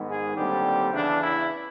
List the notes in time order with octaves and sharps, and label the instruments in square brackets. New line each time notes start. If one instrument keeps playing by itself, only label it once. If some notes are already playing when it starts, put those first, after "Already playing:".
Already playing: [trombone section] G#2 D#3 G#3 B3
G#4
D#2 D3 G3 C4 G4
E2 C#3 E3 D4
E4